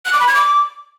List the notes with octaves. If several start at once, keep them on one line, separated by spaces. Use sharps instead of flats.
F#6
D6
B5
G#6
D6